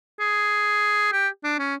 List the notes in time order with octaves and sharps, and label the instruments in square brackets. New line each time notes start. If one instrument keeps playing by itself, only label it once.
[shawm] G#4
G4
D4
C#4